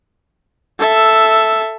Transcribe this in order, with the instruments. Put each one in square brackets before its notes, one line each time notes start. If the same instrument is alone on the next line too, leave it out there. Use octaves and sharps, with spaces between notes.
[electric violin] A4 E5